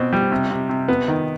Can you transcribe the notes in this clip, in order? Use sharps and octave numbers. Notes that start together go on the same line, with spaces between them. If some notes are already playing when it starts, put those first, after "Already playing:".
Already playing: B2 C4
G3
C3
C3
C3
B3
D#3